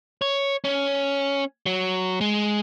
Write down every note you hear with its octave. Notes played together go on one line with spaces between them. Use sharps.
C#5
C#4
F#3
G#3